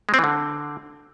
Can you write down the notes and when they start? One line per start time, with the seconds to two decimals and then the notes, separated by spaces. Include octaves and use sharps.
0.09 G#3
0.14 C4
0.19 E3
0.24 D3